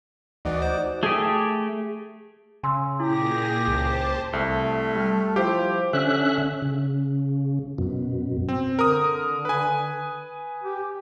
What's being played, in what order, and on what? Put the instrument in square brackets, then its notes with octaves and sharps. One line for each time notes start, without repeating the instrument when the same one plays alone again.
[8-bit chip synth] D2 E3 [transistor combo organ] D#4 F#4 D5
[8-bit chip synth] C5
[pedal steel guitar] A3 G4 [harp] G#4
[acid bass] C#3 [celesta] G#5 C6 E6
[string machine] A#2 G#4 A#6 [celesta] E4 [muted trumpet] G4
[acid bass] C#2 [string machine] C5 A5
[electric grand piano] C2 [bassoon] A3
[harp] G3 F6
[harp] F3 E4 C5 [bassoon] F4 [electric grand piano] G4
[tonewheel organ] D3 C#4 E5 F#6
C#3
F#2 B2
[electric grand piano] C4
[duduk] D3 [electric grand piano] A#4 D#6
[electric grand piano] B4 G#5
[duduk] G4